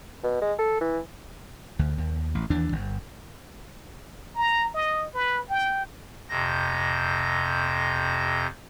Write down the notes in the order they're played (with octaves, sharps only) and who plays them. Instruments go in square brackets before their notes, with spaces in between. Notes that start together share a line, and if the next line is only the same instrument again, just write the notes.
[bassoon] B2
G#3
A4
E3
[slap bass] D2
D#2
A1
D#2 E3 D4
G1
[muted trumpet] A#5
D#5
B4
G5
[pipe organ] F2 C3 G6 A#6